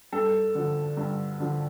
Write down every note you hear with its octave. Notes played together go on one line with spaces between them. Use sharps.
G2 A4
D3 F3
G2
D3 F3